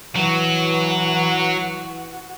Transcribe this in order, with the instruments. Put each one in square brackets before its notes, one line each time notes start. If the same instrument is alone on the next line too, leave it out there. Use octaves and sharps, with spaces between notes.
[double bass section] E3 [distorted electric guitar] F#3 [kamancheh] F#4